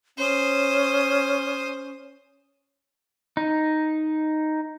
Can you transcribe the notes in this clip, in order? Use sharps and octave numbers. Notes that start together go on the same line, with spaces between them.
C#4 C5 D#6
D#4